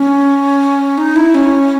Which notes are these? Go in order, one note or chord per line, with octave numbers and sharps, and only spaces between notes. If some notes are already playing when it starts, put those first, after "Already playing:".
Already playing: C#4
D#4
E4
C#4